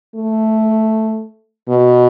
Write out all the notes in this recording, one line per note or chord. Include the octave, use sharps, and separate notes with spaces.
A3
B2